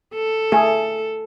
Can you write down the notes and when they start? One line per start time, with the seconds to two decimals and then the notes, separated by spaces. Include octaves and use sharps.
0.14 A4
0.52 A3 G#4